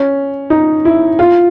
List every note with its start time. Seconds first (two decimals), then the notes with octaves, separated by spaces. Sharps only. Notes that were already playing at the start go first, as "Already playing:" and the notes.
Already playing: C#4
0.50 D#4
0.85 E4
1.19 F4